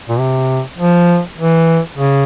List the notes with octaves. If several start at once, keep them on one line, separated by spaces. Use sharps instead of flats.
A#2
C3
F3
E3
C#3